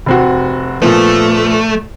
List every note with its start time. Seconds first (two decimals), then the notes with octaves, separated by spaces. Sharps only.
0.06 F1 C4 F#4
0.82 A#2 F3 A3 B3